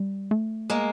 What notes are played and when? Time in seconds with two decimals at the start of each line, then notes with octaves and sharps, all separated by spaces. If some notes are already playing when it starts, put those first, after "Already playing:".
Already playing: G3
0.31 A3
0.70 G#3 A#3